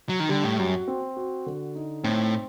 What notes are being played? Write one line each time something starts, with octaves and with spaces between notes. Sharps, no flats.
F#3
D#3
D3 G3
A2
F#2 F#4
C4
F#4
D3
D#4
A2 C4